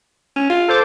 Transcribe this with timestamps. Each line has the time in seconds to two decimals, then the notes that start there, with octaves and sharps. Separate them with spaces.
0.36 C#4
0.50 F4
0.68 A4 C5 D6